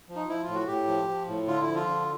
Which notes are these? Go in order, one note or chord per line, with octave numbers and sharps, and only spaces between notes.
F3
D#4
F3 E4
F4
A2
F#4
A2 G4
F3
F3
A2
D3 F4
E4
F3
F4
D3